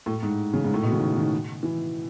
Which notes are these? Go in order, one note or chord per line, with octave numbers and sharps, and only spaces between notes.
A2
G#2
C#3
G#2
A2
B2
C#3
D#3
D#3
E3